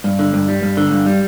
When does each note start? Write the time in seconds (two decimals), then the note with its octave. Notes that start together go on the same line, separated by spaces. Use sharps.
0.04 G2
0.19 D3
0.34 G2
0.48 G3
0.62 G2
0.77 D3
0.92 G2
1.06 G3